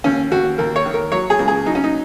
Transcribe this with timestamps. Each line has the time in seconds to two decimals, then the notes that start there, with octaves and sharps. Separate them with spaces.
0.04 D#2 C#4
0.32 D#2 F#4
0.58 D#2 A#4
0.76 C#5
0.86 D#3
0.94 A#4
1.11 F#3 C#5
1.30 G#4
1.39 C#2
1.48 G#4
1.66 F#3 D#4
1.75 C#4
1.84 D#4